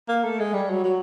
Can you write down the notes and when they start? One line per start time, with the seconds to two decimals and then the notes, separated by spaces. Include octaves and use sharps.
0.09 A#3
0.24 A3
0.39 G#3
0.54 G3
0.70 F#3
0.84 F#3